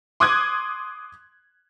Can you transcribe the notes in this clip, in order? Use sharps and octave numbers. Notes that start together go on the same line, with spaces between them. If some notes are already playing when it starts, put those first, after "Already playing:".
C6 D6 D#6 F#6 G#6